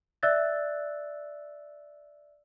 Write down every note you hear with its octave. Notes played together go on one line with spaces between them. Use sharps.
D5 E5 E6 F#6 A6